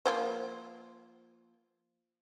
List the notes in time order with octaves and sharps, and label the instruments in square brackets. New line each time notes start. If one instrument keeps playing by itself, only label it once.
[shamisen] F3 A#3 C5